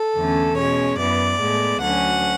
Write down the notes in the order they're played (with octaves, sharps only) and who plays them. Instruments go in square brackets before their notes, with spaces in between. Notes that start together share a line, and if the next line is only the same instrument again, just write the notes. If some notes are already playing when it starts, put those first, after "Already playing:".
Already playing: [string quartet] A4
E2 D3 A3 C#4
B2 G#3 C#4 C#5
F#2 E3 B3 D5
A2 G#3 B3
D2 D3 F#3 C#4 F#5